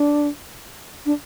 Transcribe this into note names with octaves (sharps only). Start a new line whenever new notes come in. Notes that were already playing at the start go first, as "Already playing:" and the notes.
Already playing: D4
D4